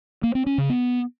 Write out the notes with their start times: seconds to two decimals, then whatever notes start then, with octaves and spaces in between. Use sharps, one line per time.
0.23 A#3
0.35 C4
0.46 C#4
0.58 C#3
0.70 B3